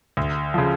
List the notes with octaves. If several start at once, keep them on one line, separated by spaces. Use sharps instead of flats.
D2
C#3 F3